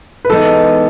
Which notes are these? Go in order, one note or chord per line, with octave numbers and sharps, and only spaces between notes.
B4
E3 G#3 B3 D#4 A4